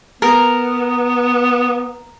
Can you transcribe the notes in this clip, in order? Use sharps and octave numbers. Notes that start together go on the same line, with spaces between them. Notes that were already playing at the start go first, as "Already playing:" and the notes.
B3 A#4